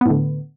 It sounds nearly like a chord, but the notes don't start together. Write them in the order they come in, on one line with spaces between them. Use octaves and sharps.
B3 A2 D3